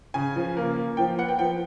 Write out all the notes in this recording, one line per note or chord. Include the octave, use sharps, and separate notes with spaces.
C#3 G#5
F3
A#3
A#3
F3 G5
B3 F#5
G5
F3 G5